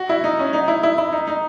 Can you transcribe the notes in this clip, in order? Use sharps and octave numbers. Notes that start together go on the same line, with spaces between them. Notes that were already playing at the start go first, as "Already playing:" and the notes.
Already playing: F#4
E4
D#4
C#4
D#4
E4
E4
E4
D#4
D#4